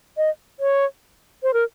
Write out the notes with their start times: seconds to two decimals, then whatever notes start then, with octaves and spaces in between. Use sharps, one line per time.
0.17 D#5
0.60 C#5
1.43 C5
1.54 A#4